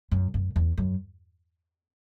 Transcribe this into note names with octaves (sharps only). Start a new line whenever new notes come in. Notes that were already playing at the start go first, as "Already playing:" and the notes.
F#2
F#2
E2
F#2